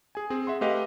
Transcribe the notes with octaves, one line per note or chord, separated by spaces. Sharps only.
G#4 G#5
C4 G#4
E5 F#5 C6
A3 G4 B4 D#5 F5